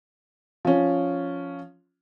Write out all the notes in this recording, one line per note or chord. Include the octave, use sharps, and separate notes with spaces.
F3 C#4